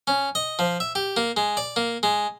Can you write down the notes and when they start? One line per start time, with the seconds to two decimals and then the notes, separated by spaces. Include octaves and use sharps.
0.07 C#4
0.35 D#5
0.59 F3
0.80 E5
0.95 G4
1.17 A#3
1.37 G#3
1.57 D5
1.76 A#3
2.03 G#3